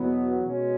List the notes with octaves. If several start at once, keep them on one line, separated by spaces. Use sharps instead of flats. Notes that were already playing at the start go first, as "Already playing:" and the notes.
Already playing: E2 B2 F#3 B3
B2 G#3 C#4